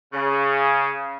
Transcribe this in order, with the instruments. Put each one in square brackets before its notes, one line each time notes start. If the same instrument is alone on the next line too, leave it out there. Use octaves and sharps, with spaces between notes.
[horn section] C#3